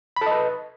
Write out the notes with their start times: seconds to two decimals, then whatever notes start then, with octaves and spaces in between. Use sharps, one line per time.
0.16 B5
0.21 A4
0.26 D#5
0.31 B4